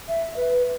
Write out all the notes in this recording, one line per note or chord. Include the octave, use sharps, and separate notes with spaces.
E5
B4